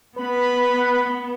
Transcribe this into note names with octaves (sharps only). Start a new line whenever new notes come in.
B3 B4 B5